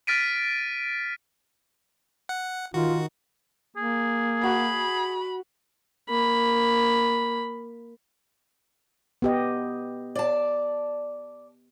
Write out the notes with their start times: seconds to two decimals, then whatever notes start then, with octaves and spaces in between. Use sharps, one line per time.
0.07 F6 A6 B6 D7 D#7
2.29 F#5
2.74 D#3 F4 F#4
3.77 A#3 G#4
4.44 F#4 B5
6.09 A#3 B5
9.22 B3 G4 D#5
10.15 D5 A5